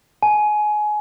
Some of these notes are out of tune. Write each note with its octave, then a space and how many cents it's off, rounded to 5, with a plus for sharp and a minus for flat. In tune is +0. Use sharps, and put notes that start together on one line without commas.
G#5 +25